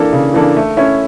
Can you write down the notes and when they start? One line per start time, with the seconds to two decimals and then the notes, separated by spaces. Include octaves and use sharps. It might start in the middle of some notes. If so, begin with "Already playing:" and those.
Already playing: E3 A#3 D4 A4
0.13 C#3
0.34 E3 A#3 D4 A4
0.56 A3
0.77 C#4 E4